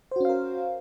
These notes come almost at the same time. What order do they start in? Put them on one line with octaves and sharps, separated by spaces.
C5 F#4 C#4 F5 A#4